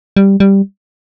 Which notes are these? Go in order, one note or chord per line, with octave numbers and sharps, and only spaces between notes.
G3
G3